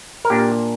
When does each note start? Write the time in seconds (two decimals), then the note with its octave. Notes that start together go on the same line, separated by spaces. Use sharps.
0.25 A#4
0.30 A#2 A#3 D4 G4